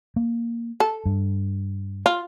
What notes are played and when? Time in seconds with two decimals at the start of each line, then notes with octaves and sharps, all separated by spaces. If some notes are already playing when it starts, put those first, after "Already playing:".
0.16 A#3
0.80 A4
1.06 G2
2.06 F4